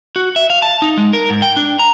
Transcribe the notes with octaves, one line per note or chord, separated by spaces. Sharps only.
F#4
E5
F5
A5
D#4
G#3
A#4
G#2
G5
D4
A#5